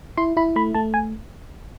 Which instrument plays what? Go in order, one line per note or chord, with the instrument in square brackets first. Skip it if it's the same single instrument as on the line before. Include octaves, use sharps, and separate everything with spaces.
[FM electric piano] E4 C6
E4 B5
A3 B5
A3 A5
G#5